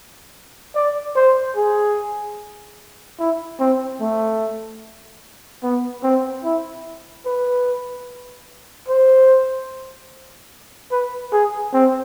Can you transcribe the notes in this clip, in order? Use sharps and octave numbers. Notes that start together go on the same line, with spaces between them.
D5
C5
G#4
E4
C4
A3
B3
C4
E4
B4
C5
B4
G#4
C4